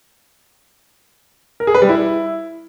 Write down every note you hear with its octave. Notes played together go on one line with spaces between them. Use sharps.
A#4
G#4
B4
G3
E4